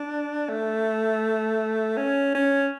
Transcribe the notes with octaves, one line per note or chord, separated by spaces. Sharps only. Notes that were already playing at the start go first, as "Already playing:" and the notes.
Already playing: D4
A3
C#4
C#4